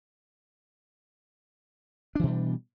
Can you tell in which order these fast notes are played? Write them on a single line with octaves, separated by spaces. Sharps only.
D4 E3 B2 G3